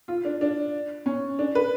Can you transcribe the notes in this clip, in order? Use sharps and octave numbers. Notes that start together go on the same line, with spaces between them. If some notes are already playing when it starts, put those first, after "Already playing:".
F4
D4
D4
C#4
D4
B4